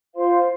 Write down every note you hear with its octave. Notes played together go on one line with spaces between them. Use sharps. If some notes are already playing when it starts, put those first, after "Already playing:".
F4 C5 F5 C6